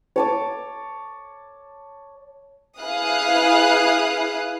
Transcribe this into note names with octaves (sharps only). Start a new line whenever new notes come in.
C#5 A5 D6
E4 G#4 B4 F5 D#6 F#6